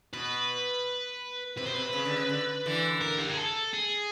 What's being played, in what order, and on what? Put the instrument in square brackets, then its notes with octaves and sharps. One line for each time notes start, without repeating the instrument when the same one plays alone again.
[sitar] B2 [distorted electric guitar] B4
[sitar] C3 [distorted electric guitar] B4
[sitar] B2 [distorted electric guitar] C5
[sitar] C3 [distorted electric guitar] B4
[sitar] C#3
D3
C#3
D3
D3 E3
[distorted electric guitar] A#4
G4
G#4
A4
G#4